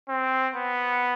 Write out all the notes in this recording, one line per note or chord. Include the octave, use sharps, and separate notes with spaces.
C4
B3